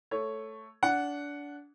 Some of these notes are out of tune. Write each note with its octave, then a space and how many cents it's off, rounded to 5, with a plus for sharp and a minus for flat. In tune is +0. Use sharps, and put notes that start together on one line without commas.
A3 +0 C#5 +0
D4 -25 F#5 +0